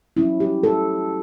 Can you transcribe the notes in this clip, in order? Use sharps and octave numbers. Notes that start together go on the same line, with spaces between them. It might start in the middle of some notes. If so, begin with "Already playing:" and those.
F#3 C#4 E4
G4
A4